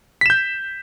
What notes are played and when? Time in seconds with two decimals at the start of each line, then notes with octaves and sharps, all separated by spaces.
0.21 B6
0.26 E7
0.30 G6